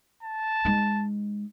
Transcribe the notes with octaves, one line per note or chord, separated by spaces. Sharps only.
A5
G#3 D#4